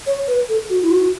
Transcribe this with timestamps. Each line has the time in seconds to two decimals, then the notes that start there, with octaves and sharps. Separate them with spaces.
0.07 C#5
0.28 B4
0.49 A4
0.70 F#4
0.82 E4
0.91 F#4